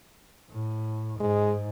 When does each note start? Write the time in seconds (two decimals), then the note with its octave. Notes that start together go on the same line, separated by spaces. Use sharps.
0.50 A2
1.20 G#2 G#3